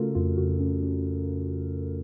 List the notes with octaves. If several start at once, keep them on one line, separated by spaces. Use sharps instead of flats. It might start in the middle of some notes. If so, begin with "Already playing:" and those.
Already playing: C#3 A3 C#4 F4 F#4 A4 A#4
F2 F4
C#3 F#4
C#4
C#4